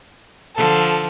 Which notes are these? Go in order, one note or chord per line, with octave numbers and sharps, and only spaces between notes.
D3 F3 A4